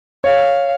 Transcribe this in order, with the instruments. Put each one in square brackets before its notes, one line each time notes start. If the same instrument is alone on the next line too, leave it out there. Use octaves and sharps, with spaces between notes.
[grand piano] C#5 [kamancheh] F5